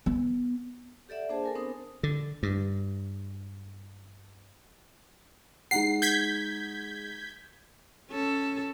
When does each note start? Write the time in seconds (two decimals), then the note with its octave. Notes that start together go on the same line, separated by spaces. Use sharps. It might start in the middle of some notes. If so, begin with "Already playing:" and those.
0.06 B3
1.09 G4 A4 D5 E5 F#5
1.29 A#3 D4 G#4 C5 A5
1.44 A4 A#4 G#5
1.55 B3 C4 D4 A#4 C5 D#6
2.03 D3
2.43 G2
5.71 G#3 D#4 F#5 C7
6.02 G6 G#6 B6
8.09 C#4 A4